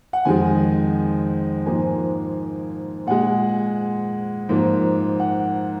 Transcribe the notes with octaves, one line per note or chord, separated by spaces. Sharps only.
F#5
F2 D#3 G#3 G#5
G#2 F3 A#3 G#5
A#2 G#3 F#5
G#2 F3 A#3
F#5